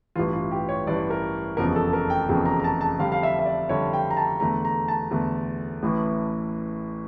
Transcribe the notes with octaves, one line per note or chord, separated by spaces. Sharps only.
A1 G2 E3 F4
F4
G4
C#5
A1 G2 E3 D5
A#4
F1 E2 C#3 F3 A#4
A4
A#4
G5
F1 E2 C#3 F3 G5
A#5
A#5
A5
A5
F2 D3 G3 F5
F5
E5
E5
D5
F2 D3 G3 C#5
G5
A#5
A5
E2 D3 A3 A#5
A#5
A5
E2 D3 A3
A1 A2 E3